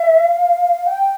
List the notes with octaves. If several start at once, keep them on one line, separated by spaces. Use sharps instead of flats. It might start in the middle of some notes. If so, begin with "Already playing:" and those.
Already playing: E5
F5
G5